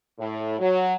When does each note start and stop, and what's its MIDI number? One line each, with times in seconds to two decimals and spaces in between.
0.19 0.56 45
0.58 0.93 54